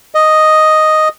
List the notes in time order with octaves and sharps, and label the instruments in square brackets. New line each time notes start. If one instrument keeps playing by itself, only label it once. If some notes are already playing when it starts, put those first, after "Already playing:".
[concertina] D#5